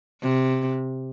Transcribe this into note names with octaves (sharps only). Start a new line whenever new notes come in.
C3